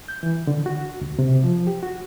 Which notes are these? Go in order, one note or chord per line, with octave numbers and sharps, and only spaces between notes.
G6
E3
D3
F#4
D2
C3
F3
G4
F#4